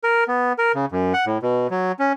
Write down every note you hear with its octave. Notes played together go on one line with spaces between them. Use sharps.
A#4
B3
A#4
C#3
F#2
F#5
A2
B2
F#3
C#4